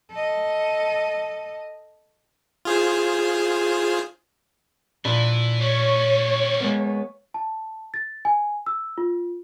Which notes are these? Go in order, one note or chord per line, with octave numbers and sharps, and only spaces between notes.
A4 D#5
F4 G#4 C5
A#2 E3 D4 B5
G3 C#4 C#5
G#3 A#3 B3
A5
A6
G#5
E6
F4